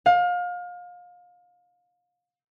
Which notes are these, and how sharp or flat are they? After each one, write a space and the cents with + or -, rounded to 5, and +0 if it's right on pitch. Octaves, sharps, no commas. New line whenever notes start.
F5 +30